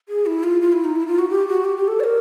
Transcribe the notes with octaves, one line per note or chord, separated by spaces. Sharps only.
G#4
E4
F4
F4
E4
D#4
E4
F4
F#4
G4
F#4
G4
G4
A4
D5
A#4